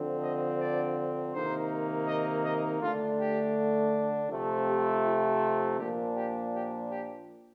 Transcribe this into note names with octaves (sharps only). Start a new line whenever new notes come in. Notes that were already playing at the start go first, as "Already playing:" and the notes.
Already playing: D3 F3 C4
D#5
D5
C3 D#3 A#3 D#4 C5
D#5
D#5
D3 A3 D4 F4
G4
C3 F3 A3 C4
G4
F4
A#2 F3 A#3 D4 G4
G4
G4
G4